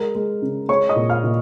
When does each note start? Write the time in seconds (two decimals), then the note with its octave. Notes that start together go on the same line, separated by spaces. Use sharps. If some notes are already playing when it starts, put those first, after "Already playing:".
Already playing: G#3 A#4
0.15 G#3
0.42 C#3
0.68 G#3 C#5 C#6
0.89 D#5 D#6
0.96 A#2
1.10 F5 F6
1.24 A#2